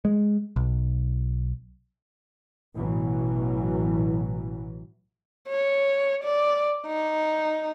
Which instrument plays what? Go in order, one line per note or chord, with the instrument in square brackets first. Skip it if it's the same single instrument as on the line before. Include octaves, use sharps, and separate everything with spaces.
[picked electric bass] G#3
B1
[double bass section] A1 B2 E3 F#3
[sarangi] C#5
D5
D#4